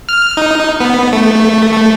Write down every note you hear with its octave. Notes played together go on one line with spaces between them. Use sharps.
F6
D#4
B3
A3
A3